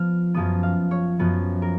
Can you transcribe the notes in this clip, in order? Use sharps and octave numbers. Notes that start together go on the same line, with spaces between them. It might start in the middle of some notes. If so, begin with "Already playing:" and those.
Already playing: F3 B3 F6
F#2 F3 B3 D#6
F5
C#5
F#2 F3 B3
A#4